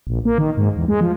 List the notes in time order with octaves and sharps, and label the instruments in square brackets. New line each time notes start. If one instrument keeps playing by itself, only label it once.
[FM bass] A#1
A#3
D#3
G#2
E2
G#3
F3